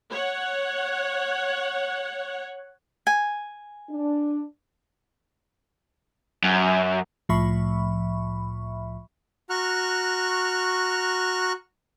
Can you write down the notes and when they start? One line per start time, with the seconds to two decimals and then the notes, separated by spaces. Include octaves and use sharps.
0.11 C#5 F#5
3.07 G#5
3.90 D4
6.43 F#2
7.29 C2 A2 F3 E5 B5 C#6
9.50 F#4 A#5 C#6 F6 F#6